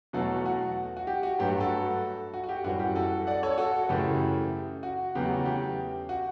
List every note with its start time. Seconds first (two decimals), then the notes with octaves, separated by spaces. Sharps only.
0.13 E2 B2 F#3 A3 F#4 A4
0.46 F#4
0.97 F#4
1.07 G4
1.23 F#4
1.39 G2 F#3 A3 G4
1.60 F#4 A4
2.34 F#4
2.44 F#4
2.49 G4
2.64 F#2 E3 G3 F#4
2.80 G4
2.95 F#4 A4
3.27 D5 F#5
3.43 A4 C#5
3.58 F#4 A4
3.89 F#2 C#3 E3 A3 G4
4.83 F#4
5.15 E2 C#3 F#3 A3 G4
5.31 F#4
5.46 G4
6.09 F#4